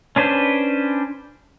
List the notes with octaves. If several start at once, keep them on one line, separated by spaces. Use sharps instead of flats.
C#4 D4 B4 C5